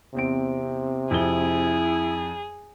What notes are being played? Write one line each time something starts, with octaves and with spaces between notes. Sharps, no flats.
E2 C3 C4 D7
F2 E4 G#4 G7